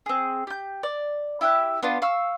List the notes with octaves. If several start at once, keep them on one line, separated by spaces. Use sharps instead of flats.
C4 G#4
G4 G6
D5
E4 G4 E5 F#6
B3 D4 F4
F5 C#6 E6